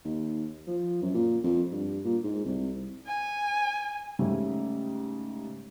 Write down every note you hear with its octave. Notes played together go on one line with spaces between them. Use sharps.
D#2
F3
F#2
A#2
F2
G2
A#2
G#2
C2
G#5
G#2 C#3 G3 A3